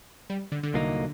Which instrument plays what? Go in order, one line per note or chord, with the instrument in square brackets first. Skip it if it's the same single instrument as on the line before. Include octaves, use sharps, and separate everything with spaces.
[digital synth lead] G3
D3
D3
[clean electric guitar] C2 A#2 F#3 A#3 D#4